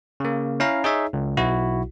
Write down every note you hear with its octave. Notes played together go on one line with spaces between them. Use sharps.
C#3 A#3
C#4 E4 F5 A#5
D#4 G#4 C#5 E5
C#2
B1 E4 F#4